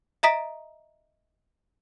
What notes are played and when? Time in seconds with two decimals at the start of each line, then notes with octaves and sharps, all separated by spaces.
0.23 D#5 E5 A#5 D#6 B6 D7